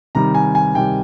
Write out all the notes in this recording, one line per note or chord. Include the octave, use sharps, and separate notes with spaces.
C3 D#3 G3 A#5
G#5
G#5
C3 D#3 G3 G5